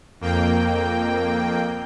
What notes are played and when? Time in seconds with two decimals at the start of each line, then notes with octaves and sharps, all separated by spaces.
0.21 F2 A#3 G5